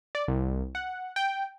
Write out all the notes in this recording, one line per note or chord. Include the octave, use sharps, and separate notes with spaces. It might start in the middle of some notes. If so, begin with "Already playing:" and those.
D5
C2
F#5
G5